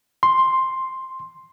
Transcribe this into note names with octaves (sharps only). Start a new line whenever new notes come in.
C6